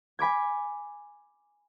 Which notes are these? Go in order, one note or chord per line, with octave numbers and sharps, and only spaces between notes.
G#5 B5 D6 G#6